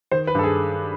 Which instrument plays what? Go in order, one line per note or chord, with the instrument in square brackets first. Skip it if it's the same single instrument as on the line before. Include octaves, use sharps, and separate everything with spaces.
[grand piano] D#3 C5
B4
G2 A4
G#4